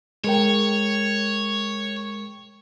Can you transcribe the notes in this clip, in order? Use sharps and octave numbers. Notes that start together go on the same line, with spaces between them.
G#3 A#4 C#5 G5